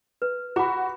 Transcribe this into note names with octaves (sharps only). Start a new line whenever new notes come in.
B4
F#4 A#5 B5 D6